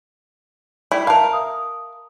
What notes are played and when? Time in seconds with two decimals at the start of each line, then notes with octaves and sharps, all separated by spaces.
0.92 G3 E4
1.07 A#4 E5 F5 A5
1.33 D#6